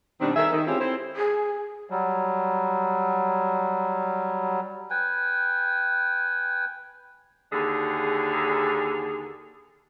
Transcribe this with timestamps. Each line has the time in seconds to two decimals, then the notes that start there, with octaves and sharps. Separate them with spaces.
0.21 B2 D#3 G3 C4 D4
0.35 D#3 G#4 A4 E5
0.52 D#3
0.67 G#3 C4 C#4 E4 F4 G4
0.79 C4 E4 A4 C5
1.16 G#4
1.90 F#3 G3
4.90 B4 G5 G#5
7.53 D#2 D3 G#4